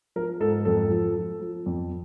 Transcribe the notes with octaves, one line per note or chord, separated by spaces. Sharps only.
F3 A#4
G#2 A4
F2 A4
F3
F3
F3
F2